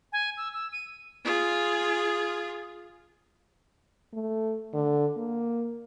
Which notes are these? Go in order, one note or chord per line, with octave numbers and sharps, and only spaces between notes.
G#5
E6
E6
D#7
F4 G#4
A3
D3
A#3